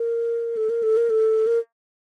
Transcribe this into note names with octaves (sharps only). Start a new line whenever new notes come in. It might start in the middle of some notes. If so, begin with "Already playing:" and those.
Already playing: A#4
A4
A#4
A4
A#4
A4
A#4